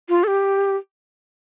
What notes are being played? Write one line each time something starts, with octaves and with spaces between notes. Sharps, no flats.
F4
A4
G4